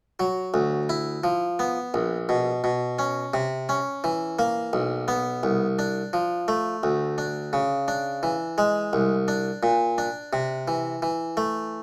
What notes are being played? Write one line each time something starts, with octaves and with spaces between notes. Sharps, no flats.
F#3
D2
E4
F3
B3
A#1
B2
B2
C#4
C3
C#4
E3
A#3
B1
B3
C2
D4
F3
A3
D2
D4
C#3
D4
E3
G#3
C2
D4
A#2
D4
C3
E3
E3
A3